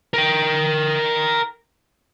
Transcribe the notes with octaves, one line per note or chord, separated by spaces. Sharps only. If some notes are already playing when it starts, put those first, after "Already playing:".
A#4 G5